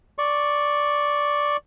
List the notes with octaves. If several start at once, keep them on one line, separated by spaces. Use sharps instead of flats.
D5 C#6